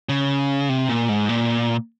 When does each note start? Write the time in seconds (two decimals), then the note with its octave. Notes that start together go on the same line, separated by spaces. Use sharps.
0.09 C#3
0.69 C3
0.89 A#2
1.09 G#2
1.29 A#2